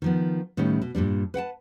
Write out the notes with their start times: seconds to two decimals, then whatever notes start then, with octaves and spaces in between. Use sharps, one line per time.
0.02 D#3 F3 B3
0.57 A2 D#3 G3 B3 C#4 D#4
0.82 B2
0.95 G2 A#2 G3 D4
1.34 B4 F#5 G5 A5